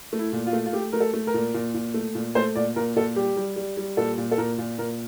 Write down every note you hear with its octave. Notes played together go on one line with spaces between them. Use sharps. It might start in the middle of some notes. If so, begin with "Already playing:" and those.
A3
E4
A#2
F4
A3
F4
A3 G4
A3 A#4
A4
A3
A#4
A#2
A#2
A#2
A3
A#2
A3 C5
A#2 D5
A#2 A#4
A#2 A4
G3 G4
G3
G3
G3
A#2 A4
A#2
A4
A#2 A#4
A#2
A#2 A#4